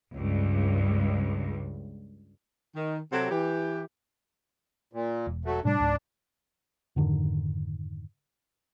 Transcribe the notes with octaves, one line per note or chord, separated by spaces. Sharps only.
C#2 G2
D#3
C3 F#3 C4 F#4 G4 A4
E3 G4
A#2
E1
F#3 A3
A2 C3 G3 D4
C#2 G#2
F2 G#2 D3 D#3